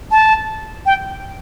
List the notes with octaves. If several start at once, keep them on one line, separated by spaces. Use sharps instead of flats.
A5
G5